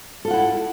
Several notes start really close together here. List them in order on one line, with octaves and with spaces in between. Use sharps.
A4 F4 F#5 E4